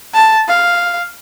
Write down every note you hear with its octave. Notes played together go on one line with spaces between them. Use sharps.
A5
F5